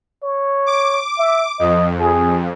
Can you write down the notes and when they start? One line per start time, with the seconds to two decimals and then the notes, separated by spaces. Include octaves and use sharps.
0.23 C#5
0.66 D6
1.19 E5
1.59 F2 D#5
2.00 G#4